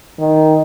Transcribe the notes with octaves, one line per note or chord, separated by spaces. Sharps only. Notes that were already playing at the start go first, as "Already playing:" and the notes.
D#3